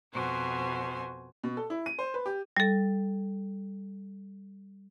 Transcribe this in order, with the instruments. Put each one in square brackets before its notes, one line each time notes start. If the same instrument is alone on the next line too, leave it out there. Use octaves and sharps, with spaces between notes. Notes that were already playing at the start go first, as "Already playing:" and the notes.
[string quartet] F2 B2 F#4 C5 G#5
[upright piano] B2
A4
E4
D#7
C5
B4
G4
[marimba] G3 A4